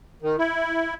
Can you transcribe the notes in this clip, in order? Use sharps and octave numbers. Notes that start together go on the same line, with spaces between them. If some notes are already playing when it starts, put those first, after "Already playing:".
D#3
E4